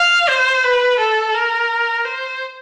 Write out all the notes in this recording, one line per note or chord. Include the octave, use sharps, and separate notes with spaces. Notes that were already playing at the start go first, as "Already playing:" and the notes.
Already playing: F5
C5
B4
A4
A#4
C5